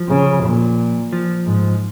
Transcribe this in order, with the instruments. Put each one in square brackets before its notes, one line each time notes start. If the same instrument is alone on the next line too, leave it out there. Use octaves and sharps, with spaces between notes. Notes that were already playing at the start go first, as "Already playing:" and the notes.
Already playing: [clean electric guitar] F3
[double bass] C#3
A#2
[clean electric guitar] F3
[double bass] G#2